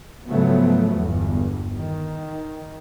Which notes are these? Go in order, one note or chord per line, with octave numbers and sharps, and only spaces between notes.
G#2 C#3 F3 F#3 A3 B3
G1 E2 G2
D#3